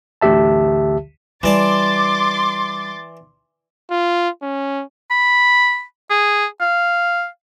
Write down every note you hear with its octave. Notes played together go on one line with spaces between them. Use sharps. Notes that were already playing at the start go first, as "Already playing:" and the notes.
A1 D2 D3 G4 E5 A5
E3 G3 D5 A5 C6 D6 A6
F4
C#4
B5
G#4
F5